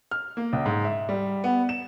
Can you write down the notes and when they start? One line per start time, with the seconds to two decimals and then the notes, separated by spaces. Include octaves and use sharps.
0.11 F6
0.37 A#3
0.53 C#2
0.66 G#2
0.84 E5
1.09 G3
1.44 B3
1.69 E7